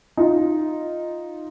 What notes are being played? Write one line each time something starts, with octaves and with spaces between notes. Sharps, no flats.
D#4 F4